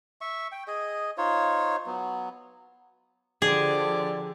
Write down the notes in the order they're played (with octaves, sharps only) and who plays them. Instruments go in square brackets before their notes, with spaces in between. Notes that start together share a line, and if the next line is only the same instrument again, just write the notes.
[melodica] E5 C#6
G5
G#4 D#5
D#4 F4 C5 C#5
F#3 B3
[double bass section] D3 F3 [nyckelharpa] G4 D6 [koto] G#4 [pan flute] D5